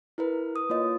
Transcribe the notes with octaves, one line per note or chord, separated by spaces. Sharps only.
E4 A#4 B4
D#6
A#3 F4 C#5 D#5